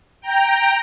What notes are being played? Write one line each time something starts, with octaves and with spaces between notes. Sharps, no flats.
G5 A#5